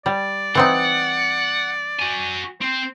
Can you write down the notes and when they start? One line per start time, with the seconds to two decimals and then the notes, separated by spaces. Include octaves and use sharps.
0.06 G3 D5
0.55 E3 C4 D#4 F#5
1.99 F#4 G#5
2.62 C4 C5